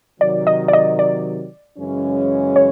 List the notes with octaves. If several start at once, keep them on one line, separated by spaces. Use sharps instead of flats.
C3 D#3 F#3 D5
D#5
D5
D#5
D5
F#2 C#3 E3 G#3 C#4
C#5